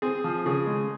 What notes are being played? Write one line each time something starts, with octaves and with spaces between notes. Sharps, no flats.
C4 G#4
F3
C#3 G#4
G#3